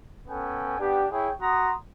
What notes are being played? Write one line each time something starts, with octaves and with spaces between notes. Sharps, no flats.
B3 C#4 A4 G5 G#5
B3 D4 G4
E4 G#4 C#5 G5
F#4 A#5 C6 D#6